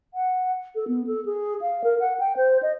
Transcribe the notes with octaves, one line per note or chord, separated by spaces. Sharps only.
F#5
A4
B3
A4
G#4
F5
A#4
F#5
G5
C5
D#5